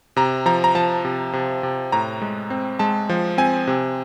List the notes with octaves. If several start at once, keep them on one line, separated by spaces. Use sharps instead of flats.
C3 A#5
F3 A#5
A#5
F3 A5
C3
C3
C3
A2 A#5
G#3
C4
G#3 A5
F3
C4 G#5
C3